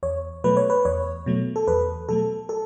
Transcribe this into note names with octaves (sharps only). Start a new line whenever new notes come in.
E2 C#5
B2 F#3 A3 B4
C#5
B4
E2 C#5
B2 F#3 A3
A4
E2 B4
B2 F#3 A3 A4
A4